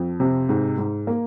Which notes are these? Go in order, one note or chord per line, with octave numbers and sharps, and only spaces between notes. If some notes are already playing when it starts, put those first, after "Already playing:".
Already playing: F2
C3
G#2
G#2
A#3